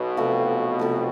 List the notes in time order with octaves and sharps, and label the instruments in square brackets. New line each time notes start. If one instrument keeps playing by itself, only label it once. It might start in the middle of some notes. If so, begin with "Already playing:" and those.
Already playing: [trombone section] B1 B2
[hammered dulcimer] C3 F3 A3
C3 F3 A3